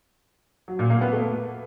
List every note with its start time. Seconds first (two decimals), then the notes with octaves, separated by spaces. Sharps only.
0.68 F#3
0.79 A#2
0.90 A#3
1.01 B3
1.12 A3